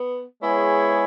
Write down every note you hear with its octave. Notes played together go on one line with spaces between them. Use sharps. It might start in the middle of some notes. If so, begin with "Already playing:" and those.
Already playing: B3
G#3 B3 E4 G#4 C#5